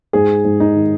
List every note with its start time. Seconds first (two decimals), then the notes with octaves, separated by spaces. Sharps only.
0.13 G#2 G#4
0.45 G#2
0.60 D#4
0.75 D#3